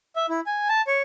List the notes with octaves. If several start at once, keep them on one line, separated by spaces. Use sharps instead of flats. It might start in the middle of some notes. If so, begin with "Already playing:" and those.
E5
E4
G#5
A5
C#5